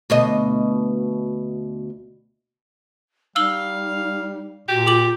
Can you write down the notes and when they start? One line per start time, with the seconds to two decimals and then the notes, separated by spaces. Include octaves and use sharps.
0.10 D2 B2 D#5
3.36 G3 D#4 F5 E6 F#7 G7
4.68 A#2 F#4 G4
4.86 F4 G#4 D6 F#7